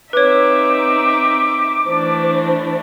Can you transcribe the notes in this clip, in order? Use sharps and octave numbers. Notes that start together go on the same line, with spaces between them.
C4 D#4 B4 C#5 E5 D6
E3 A3 D4 C5